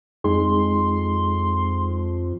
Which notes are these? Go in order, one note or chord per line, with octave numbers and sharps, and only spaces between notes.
F2 G#3 D#4 G#4 C6